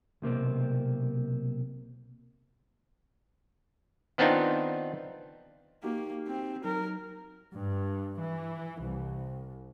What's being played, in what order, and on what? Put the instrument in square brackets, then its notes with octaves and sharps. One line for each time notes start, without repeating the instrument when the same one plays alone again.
[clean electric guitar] B1 C3 A#3 C4
[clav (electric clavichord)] D#3 B3 C4 D4 D#4 F4
[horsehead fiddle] A#3 [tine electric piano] D#4 F#4 G4
[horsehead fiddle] C4
[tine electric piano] F#3 D#4 [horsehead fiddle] A#4
[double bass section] G2
E3
C2